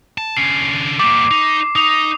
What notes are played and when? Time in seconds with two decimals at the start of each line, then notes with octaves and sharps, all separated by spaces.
0.18 A5
0.37 D3 C#4 C7
0.99 G3 A#3 D6
1.31 D#4
1.76 D#4 D#6 F7